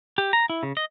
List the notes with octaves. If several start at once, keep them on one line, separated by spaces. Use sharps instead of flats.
G4
A#5
E4
C#3
D#5